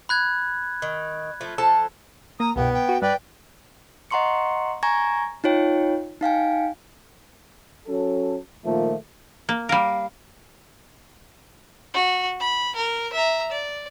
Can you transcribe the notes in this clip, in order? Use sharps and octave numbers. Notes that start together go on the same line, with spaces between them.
B5 F#6 G#6
D#3
F3 A3
F3 A4 A5
A#3 A#5 D#6
C2 G2 B2 B3 G5
G5
F#4
G2 B4 D5 G5
D#5 F#5 A#5 C6 C#6 C#7
G#5 A#5 C#6 G#6 A#6
D#4 F4 C#5 G5
D#4 F5 G5 G#5
F#3 C#4 A4
A#2 D#3 F3 A3 A#3
A#3
G3 A#4 F5
F#4
B5
A#4
E5 A#5
D5